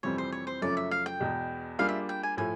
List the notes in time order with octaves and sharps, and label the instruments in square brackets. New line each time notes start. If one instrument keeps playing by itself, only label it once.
[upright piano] F2 C3 E3 G3 C4 [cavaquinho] C#5
[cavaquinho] C5
C#5
C5
[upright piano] F#2 C#3 F3 A3 C#4 [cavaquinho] D5
[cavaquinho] E5
F5
G5
[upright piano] E2 B2 G#3
[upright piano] G3 A#3 D4 F4 G#4 [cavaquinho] F5
[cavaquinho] E5
G5
G#5
[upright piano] A2 F3 A3 [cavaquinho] G#5